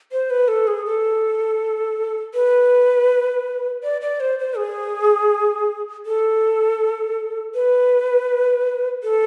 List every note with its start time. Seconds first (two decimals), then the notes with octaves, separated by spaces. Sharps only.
0.12 C5
0.30 B4
0.48 A4
0.67 G#4
0.86 A4
2.34 B4
3.83 D5
4.01 D5
4.20 C5
4.39 C5
4.57 G#4
6.06 A4
7.55 B4
9.03 A4